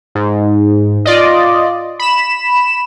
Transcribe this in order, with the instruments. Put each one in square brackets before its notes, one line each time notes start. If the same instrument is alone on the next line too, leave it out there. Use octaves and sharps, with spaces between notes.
[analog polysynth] G#2
F4 D5 D#5
B5 E7